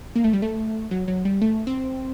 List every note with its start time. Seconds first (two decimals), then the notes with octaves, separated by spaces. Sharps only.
0.15 A#3
0.24 A3
0.33 G3
0.42 A3
0.91 F#3
1.08 F#3
1.25 G3
1.41 A3
1.67 C4